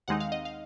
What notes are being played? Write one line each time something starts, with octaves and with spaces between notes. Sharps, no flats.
D#2 D#3 G#3 C4 D#4 F#5
F5
D#5
F5